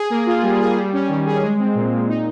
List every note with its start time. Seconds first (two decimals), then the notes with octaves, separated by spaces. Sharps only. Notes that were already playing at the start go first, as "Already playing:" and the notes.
Already playing: G#4
0.10 A#3
0.26 F4
0.43 G3
0.60 G#4
0.77 G3
0.93 C#4
1.09 D#3
1.26 G#4
1.42 G#3
1.59 C4
1.75 A#2
1.92 A#2
2.08 D#4